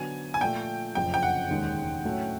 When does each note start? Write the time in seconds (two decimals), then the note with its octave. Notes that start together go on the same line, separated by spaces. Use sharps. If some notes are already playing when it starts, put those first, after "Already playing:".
Already playing: D3 F#3 B3 G#5
0.34 G#5
0.41 A#2 F3 A3 G5
0.95 F#1 F2 C#3 F3 G5
1.14 G5
1.23 F#5
1.50 E1 D#2 D#3 G#3 C#4
2.05 A2 F#3 A3 C#4